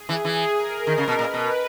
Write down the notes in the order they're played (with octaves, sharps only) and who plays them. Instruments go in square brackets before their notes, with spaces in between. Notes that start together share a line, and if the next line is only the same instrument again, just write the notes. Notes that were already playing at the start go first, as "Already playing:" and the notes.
Already playing: [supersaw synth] G#4
[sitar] E3
E3
[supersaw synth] A#4
[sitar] D#3 [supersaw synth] A#4
[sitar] C#3
B2
[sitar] A#2 [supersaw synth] B4
[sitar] B2